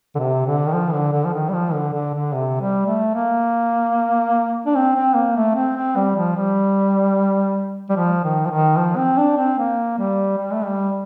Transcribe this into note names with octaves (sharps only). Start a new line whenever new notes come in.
D3
C3
D3
D#3
F3
D3
D3
F3
D#3
G3
F3
D3
D3
D3
C3
G3
A3
A#3
D4
C4
C4
A#3
A3
C4
C4
G3
F3
G3
G3
F3
D#3
F3
D#3
F3
C4
D4
C4
A#3
G3
G3
A3
G3